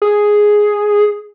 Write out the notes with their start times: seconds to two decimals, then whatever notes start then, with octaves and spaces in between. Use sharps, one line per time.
0.02 G#4